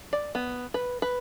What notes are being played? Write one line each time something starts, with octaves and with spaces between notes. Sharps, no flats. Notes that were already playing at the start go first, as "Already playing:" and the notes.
D5
B3
B4
B4